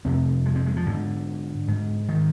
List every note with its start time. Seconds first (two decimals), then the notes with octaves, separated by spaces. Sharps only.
0.05 F2 C3 C4
0.46 G#3
0.56 C4
0.66 G#3
0.77 F3
0.86 G#2 D3
1.68 G#2
2.09 D#3